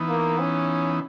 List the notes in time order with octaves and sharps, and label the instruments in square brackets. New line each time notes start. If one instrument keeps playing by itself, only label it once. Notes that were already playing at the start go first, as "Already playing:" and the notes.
Already playing: [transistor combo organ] E3 B3 D#4
[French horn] A#3
C#4